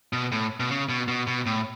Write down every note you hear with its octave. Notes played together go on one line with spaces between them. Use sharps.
B2
A2
B2
C#3
B2
B2
B2
A2